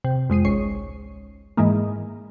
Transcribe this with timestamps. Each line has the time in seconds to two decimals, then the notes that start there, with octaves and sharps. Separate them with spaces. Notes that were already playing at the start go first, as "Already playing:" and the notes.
0.04 C3
0.30 F2 G#3 C7 D#7
0.45 G#1 C#2 C#5 C#6 C7
1.57 G#2 D#3 E3 G#3 A#3